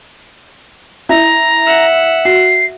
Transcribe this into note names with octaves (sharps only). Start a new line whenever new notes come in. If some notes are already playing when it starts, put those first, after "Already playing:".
E4 A#5
E5 F#5
F#4 C7